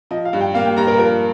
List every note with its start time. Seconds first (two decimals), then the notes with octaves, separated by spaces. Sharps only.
0.11 F3 D#5
0.25 F5
0.33 G2
0.41 G5
0.54 A#3 F5
0.66 G5
0.77 G2 A#5
0.87 A#4
0.99 F3 A#4